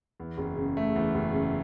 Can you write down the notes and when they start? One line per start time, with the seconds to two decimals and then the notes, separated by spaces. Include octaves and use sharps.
0.20 E2
0.38 F#1
0.57 C#3
0.77 A3
0.96 E2
1.14 F#1
1.33 C#3